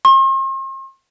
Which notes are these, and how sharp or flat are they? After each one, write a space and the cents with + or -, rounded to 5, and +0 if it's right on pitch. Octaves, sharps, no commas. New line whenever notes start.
C6 +45